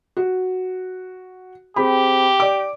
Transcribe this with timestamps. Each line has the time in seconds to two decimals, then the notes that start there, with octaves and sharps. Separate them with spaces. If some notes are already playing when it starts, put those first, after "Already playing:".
0.17 F#4
1.76 C4 G4 G#4 B5
2.40 D5 D6